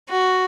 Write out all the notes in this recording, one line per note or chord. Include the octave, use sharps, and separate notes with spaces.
F#4